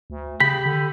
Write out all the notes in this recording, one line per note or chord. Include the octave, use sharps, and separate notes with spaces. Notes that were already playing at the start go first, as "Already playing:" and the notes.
D2
C#3 G4 B5 B6
D3